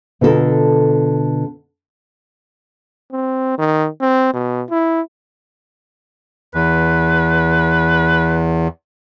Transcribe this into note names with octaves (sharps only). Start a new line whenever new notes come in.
B2 D3 F4 F#4 A4 A#4
C4
D#3
C4
B2
E4
E2 B4